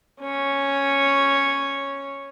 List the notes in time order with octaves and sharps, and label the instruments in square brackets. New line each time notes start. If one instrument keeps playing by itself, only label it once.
[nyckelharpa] C#4 C#5